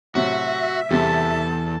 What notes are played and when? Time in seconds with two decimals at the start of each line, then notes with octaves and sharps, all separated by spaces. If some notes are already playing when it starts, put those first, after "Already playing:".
0.15 A2 C3 F#3 F#4 E5
0.91 E2 C3 G3 A4 A5